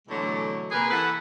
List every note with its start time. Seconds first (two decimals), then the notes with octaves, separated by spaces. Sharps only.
0.08 B2 D3 E3 F#3 G#3 A3
0.71 C3 A#3 G#4 A#4 B4
0.91 E3 A4 B4 E5 F#5